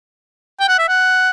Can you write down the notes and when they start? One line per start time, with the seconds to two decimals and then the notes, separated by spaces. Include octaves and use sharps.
0.60 G5
0.68 F#5
0.78 E5
0.88 F#5